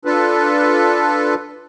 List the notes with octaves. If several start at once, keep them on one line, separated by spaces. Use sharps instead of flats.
D4 F4 A4 B4